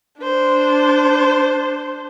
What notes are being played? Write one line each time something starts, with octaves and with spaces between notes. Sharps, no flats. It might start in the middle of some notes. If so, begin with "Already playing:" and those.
D4 C5